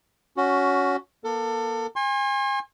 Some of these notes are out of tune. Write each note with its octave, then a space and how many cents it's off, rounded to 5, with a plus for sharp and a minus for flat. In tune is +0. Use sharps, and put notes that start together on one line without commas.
C#4 +15 F#4 +0
A#3 +35 A4 +30
G#5 -30 C6 +40